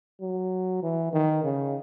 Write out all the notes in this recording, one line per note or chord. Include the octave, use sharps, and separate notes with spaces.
F#3
E3
D#3
C#3